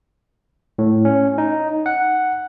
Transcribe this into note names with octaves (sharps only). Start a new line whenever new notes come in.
A2
C#4
D#4
F#5